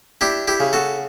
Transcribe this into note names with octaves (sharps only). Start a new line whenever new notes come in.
D4 E4 G4
E4 G4
C#3
F#4 A4